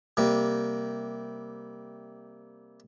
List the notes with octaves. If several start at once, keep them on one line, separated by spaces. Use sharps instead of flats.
C3 G3 A#3